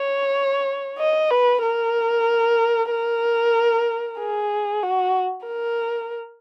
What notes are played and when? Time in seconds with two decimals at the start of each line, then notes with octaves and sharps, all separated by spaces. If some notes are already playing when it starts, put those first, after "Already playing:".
Already playing: C#5
0.98 D#5
1.31 B4
1.62 A#4
2.90 A#4
4.19 G#4
4.83 F#4
5.47 A#4